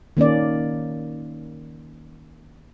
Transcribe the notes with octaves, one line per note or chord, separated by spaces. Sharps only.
D#3 A#3 C#4 D5